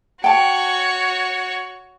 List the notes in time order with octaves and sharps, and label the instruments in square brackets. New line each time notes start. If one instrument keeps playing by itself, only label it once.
[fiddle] F#4 C#5 [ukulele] G5 A5